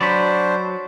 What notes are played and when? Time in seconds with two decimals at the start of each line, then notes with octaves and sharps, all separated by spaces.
0.01 F#3 D4 C5 D5 B5 C#6 B6